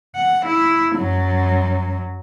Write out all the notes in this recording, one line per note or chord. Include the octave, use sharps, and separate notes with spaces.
F#5
E4
F#2 F#3